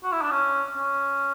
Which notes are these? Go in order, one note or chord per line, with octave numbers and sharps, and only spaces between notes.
F#4
E4
D4
C#4
C#4